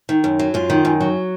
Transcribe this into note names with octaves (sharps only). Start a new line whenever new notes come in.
D#3
F#2
F#3
F#2 F4
D#3
F#2
F#3